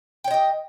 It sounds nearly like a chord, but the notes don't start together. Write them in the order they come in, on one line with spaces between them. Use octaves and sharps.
G5 C#5 D#5 G4